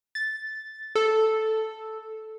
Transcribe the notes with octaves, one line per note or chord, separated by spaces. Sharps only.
A6
A4